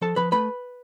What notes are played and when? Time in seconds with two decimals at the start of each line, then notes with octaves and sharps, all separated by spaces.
0.02 F3 A4 A5
0.16 F3 B4 B5
0.32 A3 B4 B5